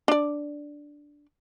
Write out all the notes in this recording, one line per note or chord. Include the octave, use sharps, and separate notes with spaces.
D4 D5